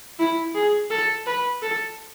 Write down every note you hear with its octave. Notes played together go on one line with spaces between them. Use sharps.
E4
G#4
A4
B4
A4